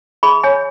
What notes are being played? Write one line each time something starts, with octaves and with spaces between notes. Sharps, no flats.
G#4 B5
C#5 G#5